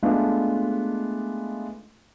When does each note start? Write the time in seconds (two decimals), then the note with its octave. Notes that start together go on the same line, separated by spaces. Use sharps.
0.02 G#3 A3 B3 D4 D#4 F4